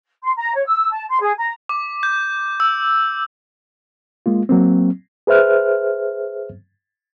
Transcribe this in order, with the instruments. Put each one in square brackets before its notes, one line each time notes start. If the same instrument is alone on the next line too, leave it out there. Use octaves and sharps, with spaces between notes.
[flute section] C6
A#5
C#5
E6
A5
C6
G#4
A#5
[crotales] D6
G6
E6
[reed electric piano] G#3 A#3 F4
F#3 A#3 C4
G#4 B4 C5 E5 F6 F#6